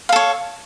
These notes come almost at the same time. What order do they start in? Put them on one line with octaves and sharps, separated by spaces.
F5 A4 C#5